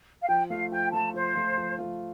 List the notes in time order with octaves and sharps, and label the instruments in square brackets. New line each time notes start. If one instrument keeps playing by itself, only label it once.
[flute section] F5
[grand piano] F3 [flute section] G5
[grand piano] A3 F4 [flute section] F5
[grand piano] F3 [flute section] G5
[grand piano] A3 F4 [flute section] A5
[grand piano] F3 [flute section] C5
[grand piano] A3 F4
F3
A3 F4